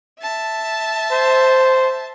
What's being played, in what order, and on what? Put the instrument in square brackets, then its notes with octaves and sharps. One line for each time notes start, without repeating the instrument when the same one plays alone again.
[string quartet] E5 A5
[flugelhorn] C5